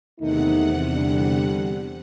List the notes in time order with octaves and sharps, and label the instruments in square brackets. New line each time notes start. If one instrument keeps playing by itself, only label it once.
[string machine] E2 C3 F#5 [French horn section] D#3 A3 D#4
[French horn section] D3 G3 D4